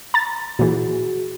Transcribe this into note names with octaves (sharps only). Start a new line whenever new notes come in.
A#5 A6
A#2 E3 F#4 G#4